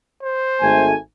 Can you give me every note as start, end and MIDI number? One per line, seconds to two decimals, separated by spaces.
0.23 0.88 72
0.61 0.94 32
0.61 0.94 57
0.61 0.94 80